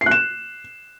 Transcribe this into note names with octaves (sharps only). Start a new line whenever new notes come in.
C7
F#6
E7